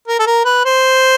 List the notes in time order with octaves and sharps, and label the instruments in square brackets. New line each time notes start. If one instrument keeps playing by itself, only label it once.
[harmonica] A#4
A4
A#4
B4
C5